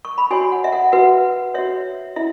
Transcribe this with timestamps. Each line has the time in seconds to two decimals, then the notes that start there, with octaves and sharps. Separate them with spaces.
0.05 C#6
0.18 B5
0.31 F#4 C#5 G#5
0.52 F#5
0.64 E5
0.72 F#5
0.92 F#4 B4 F#5
1.54 F#4 C#5 E5
2.16 E4 E5